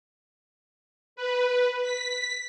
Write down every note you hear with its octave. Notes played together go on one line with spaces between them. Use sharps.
B4
B6